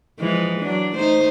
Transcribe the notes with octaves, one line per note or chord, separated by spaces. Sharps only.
E3 F3 G#3
F#3 D4
A3 D#4 C5